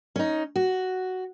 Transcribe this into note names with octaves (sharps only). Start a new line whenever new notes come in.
C#4 D#4
F#4